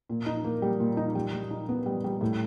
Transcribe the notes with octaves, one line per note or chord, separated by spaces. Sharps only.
A#2
D#4
A#3
G3
A#2
D#4
G3
G3
D#4
B3
G3
G3
A2